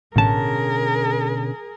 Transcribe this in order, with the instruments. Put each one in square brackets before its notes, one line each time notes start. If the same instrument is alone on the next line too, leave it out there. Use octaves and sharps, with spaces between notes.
[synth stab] A1 A5 [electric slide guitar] B2 D3 C#4 [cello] G#4 A#4